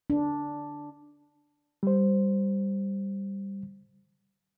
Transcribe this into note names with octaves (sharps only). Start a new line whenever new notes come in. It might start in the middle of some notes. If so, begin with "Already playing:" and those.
D4
G3 C5